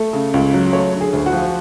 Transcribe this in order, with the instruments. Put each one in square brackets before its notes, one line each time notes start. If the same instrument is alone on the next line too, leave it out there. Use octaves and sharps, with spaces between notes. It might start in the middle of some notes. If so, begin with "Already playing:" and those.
Already playing: [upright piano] A3
C#3
C#2
F#3
A3 C#5
D3
G#4
D2
F#4
F3